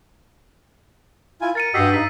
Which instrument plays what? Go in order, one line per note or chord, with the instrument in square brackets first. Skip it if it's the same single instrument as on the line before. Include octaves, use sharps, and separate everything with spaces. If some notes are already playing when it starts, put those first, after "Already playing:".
[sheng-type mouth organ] E4 F4 G#5
[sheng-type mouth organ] A#4 [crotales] A6 C#7 D#7
[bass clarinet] G2 [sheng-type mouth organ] F#4 G4 D#5 [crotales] E6 B6 C7
[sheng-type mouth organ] D#4 [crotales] B6